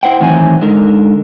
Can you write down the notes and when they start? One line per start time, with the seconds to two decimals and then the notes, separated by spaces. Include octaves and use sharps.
0.03 E4 C5 F#5 G5
0.20 A2 D#3 E3 F#3 C4 G#5
0.61 D3 G#3 D#4 A#4